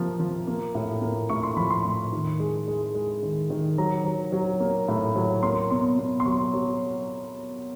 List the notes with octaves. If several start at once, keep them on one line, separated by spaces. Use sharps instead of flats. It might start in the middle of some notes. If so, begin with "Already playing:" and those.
Already playing: C3 F3 A#3
F3
A#3
A2
A#3
A2 C#6
C6
F3 B5
C6
A2
D#3
G#3
G#3
G#3
D#3
D#3
F#3 A#5
F#3
F#3
A#3
A2
F#3
A#3 C6
B2 C6
B2
C6
F#3 C#6
F#3